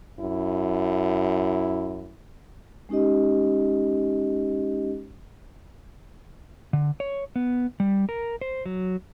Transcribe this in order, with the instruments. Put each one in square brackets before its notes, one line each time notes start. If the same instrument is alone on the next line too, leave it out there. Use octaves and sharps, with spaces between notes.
[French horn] F#2 [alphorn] E4
[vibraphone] G#3 C#4 D#4 G4 D#5
[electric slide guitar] D3
C#5
B3
G3
A#4
C5
F#3